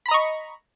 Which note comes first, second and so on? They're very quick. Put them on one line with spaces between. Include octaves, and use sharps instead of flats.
B5 A#5 D#5 C#6